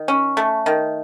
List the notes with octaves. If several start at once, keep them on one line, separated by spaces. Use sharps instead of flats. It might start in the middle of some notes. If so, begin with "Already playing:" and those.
Already playing: D#3
C#4
A3
D#3